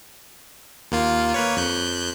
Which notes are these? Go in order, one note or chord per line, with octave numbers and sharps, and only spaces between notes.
D#2 A#3 F4
A#3 B4 C#5
F2 F#6 G6